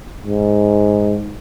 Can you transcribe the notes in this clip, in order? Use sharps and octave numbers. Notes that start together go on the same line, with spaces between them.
G#2